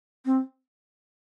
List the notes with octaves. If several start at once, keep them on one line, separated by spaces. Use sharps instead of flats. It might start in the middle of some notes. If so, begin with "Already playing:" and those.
C4